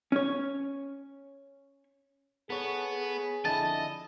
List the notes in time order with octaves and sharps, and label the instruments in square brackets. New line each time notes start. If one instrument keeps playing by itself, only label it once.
[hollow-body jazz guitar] C#4 C#5
[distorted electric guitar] B3 [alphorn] G#4 [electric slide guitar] A4 C#5
[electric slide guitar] F2 D3 E4 [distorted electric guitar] D#5 [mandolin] A5